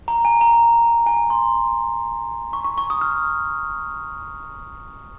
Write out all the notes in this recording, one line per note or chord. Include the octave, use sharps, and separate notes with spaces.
A#5
G#5
A#5
G#5
C6
C#6
C#6
C#6
D#6
F6